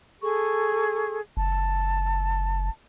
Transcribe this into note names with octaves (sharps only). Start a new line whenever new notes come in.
G#4 A4 C#6
F#1 A5